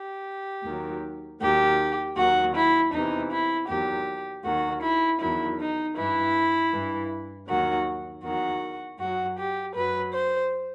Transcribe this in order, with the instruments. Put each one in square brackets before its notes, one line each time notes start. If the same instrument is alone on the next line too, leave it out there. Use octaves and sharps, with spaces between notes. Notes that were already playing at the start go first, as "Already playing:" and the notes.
Already playing: [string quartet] G4
D#2 D#3 F#3
D#2 D#3 F#3 G4
D#2 D#3 F#3 F#4
E4
E2 C3 E3 D#4
E4
E2 D#3 F#3 G4
D#2 D#3 F#3 F#4
E4
E2 D#3 F#3 E4
D#4
G2 E3 E4
G2 E3
D#2 D#3 F#3 F#4
E2 D#3 F#3 F#4
F#2 F#3 F#4
G4
F#2 F#3 B4
C5